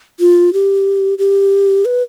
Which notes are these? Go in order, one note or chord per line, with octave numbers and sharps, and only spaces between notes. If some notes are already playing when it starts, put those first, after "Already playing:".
F4
G4
G4
B4